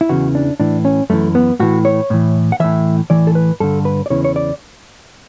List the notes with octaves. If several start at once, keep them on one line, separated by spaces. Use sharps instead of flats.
E4
E2 C#3 E3 F#4
D4
A2 E3 D4
C#4
F#2 E3 A3
B3
A2 E3 F#4
C#5
A2 E3
F#5
A2 E3 E5
A2 E3 D5
A4
B4
G2 D3 A4
B4
D5
E2 C#3 E3 C#5
C#5
D5